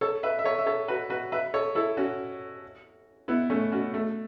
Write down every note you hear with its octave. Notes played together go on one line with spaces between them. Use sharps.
A4 C#5
B4 E5
E5
A4 C#5
E5
A4 C#5
F#4 B4
F#4 B4
B4 E5
A4 C#5
E4 A4
C#4 F#4
B3 E4
A3 C#4
C#4 F#4
A3